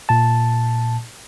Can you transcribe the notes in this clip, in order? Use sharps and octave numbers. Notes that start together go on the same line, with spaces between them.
A#2 A5